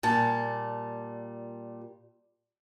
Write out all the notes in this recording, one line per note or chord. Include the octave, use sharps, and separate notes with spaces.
A#2 G3 A5